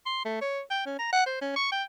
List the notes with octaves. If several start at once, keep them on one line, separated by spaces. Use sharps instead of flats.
C6
A3
C#5
G5
C#4
A#5
F#5
C5
C#4
C#6
G5